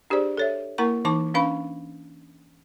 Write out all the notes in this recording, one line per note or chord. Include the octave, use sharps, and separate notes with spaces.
D4 G4 G#4 C5 D5
A4 C#5 E5
A#3 E4 A#4 F#5 A#5 C#6
E3 D#4 A5 C#6 D6
C#4 D4 B4 F5 B5 C#6